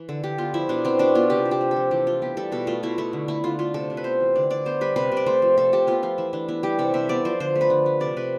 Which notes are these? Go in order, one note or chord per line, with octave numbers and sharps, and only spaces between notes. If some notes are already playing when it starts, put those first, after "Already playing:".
Already playing: E3
D3 A4
D3 G4
B3 F4
F3 E4
B2 D4
B3 C4
B2 D4
B3 F4
C3 G4
C3
G4
A3
A4
F3
E3 G4
E3 F4
B3 G4
G3 A4
B2 A4
A3 F4
B2 E4
A3 E4
D3
A3 E4
D3 F4
A3 F4
C3 A4
C3
B4
B3 C5
E3
D3 D5
D3 D5
B3 C5
G3 B4
C3 B4
C3
D5
A3 C5
F3
C3 A4
C3 G4
B3 F4
F3 F4
E3 E4
E3 D4
B3 E4
G3 G4
C3 A4
C3 E5
B3 D5
F3 C5
D3 C5
A3
B4
D3
A3
C3 D5
C3 B4